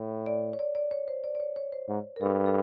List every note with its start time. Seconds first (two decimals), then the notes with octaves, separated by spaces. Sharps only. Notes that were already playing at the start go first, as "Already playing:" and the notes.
Already playing: A2
0.26 D5
0.53 C#5
0.59 D5
0.75 D5
0.91 C#5
1.08 C5
1.24 D5
1.35 D5
1.40 C#5
1.56 C#5
1.72 C5
1.88 G#2
2.16 A#4
2.21 G2 A4
2.46 A4